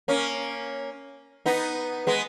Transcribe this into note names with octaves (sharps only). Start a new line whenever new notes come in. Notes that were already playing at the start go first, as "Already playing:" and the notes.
A#3 C#4
B3 D#4
G#3 B3